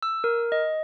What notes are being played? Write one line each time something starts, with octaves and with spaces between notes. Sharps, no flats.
E6
A#4
D#5